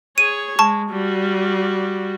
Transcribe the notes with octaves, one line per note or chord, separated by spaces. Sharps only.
G#4 C#5 D#7
G#3 A5 C#6
G3 F#4